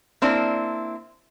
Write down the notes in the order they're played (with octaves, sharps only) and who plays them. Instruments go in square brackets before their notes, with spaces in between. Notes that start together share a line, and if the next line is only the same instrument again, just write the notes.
[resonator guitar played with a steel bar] A#3 C4 D4 E4